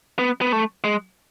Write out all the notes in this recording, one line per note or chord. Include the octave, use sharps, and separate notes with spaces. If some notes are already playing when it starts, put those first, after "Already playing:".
B3
B3
A3
G#3